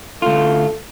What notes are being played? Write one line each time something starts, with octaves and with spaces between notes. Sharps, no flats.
D2 F4 A4